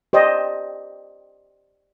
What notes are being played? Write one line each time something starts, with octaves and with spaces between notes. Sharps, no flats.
G4 C5 D5 D#5